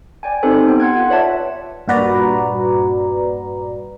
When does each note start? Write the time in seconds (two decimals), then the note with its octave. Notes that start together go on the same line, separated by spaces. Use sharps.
0.23 D5 G5 G#5
0.43 C4 D#4 G4 A4 C5
0.67 B3 G5
0.80 F#5 C6 F#6 G#6
0.95 F4 F#5
1.10 B4 C#5 D5 E5 A5
1.88 G2 A#2 F#4 B4 D5 A#5